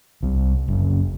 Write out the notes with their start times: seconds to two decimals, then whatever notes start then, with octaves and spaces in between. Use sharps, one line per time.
0.23 C2
0.68 F#1